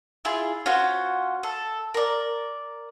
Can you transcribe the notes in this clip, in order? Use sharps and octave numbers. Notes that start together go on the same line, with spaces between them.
E4 F4 G#4
C#4 F4 F#4 C5
A4
A#4 D5